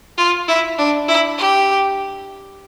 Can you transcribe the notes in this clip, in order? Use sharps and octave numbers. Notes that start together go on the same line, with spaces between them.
F4
E4
D4
E4
G4